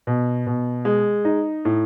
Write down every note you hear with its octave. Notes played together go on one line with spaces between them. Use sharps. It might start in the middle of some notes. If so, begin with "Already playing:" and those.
B2
B2
G#3
D#4
A2